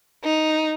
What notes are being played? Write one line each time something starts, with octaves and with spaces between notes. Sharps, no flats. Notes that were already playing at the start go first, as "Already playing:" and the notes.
D#4